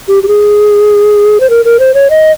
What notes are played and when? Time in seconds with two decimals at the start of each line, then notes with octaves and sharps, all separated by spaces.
0.08 G4
0.23 G4
0.28 G#4
1.40 C5
1.50 A#4
1.65 A#4
1.80 C5
1.94 C#5
2.10 D#5